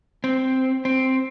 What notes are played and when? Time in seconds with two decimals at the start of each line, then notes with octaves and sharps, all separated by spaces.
0.24 C4
0.85 C4